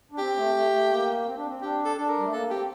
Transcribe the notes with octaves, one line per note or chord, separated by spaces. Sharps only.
D4
C4 G4
A3
A3
A3
A#3
C4
D4
C4
D4 G4
A4
D4 A4
A#4
G3
A3
A#3 A4
C4 G4